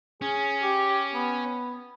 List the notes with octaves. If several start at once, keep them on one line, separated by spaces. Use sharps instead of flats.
C#4 G#4
G4
B3